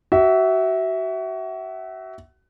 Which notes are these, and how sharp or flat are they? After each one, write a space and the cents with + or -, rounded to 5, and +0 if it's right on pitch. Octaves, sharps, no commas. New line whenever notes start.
F#4 +30 E5 -10